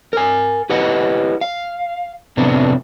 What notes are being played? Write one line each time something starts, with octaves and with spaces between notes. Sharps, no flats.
A#4 G#5
E4 G4 B4 D#5 F#5
F5
F2 A2 C3 A3 B3 D4